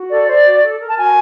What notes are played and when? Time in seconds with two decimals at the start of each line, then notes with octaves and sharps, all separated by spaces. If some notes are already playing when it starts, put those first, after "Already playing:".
Already playing: F#4
0.10 A4 D5
0.28 C5 D5
0.45 F#4
0.62 A4
0.80 A#4
0.89 A5
0.97 F#4 G#5